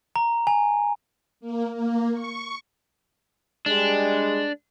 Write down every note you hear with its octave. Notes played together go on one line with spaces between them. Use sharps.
A#5
G#5
A#3
A#3
C#6
G3 G#3 D4